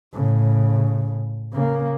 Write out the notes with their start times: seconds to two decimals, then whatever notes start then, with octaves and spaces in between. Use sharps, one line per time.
0.13 A2 C#3
1.53 C#3 A#3